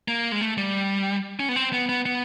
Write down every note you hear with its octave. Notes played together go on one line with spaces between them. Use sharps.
A#3
G#3
A3
G3
C#4
B3
C4
B3
B3
B3